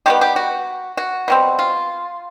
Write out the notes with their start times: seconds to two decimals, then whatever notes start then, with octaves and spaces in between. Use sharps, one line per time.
0.06 D#3 G3 B3 G4
0.21 G4
0.36 F#4
0.97 F#4
1.28 B2 G3 C4
1.59 F4